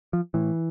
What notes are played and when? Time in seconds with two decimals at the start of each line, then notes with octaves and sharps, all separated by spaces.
0.13 F3
0.34 A2 E3